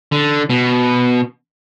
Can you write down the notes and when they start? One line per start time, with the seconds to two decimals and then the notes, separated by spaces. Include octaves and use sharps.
0.12 D3
0.50 B2